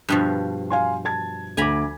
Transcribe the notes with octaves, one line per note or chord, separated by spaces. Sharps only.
G2 B2 F3
F5 G#5 C6
A5 G#6
D2 G#5 A#5 B5 D6